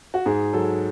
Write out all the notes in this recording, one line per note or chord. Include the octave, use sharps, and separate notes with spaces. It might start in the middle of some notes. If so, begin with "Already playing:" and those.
F#4
G#2 G#4
F#3 A4